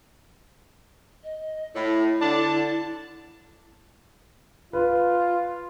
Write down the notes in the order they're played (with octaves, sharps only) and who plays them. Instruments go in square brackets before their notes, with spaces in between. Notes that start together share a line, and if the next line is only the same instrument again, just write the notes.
[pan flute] D#5
[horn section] A2 [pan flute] E4
[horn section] D3 D4 A5
[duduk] F4 [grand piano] B4